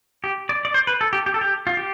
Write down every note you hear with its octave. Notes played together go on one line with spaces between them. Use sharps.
G4
D5
D5
C5
B4
A4
G4
G4
A4
G4
F4
G4